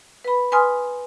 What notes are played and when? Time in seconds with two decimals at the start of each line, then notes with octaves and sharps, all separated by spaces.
0.24 B4 B5
0.52 B4 G#5 C6 D#6 F6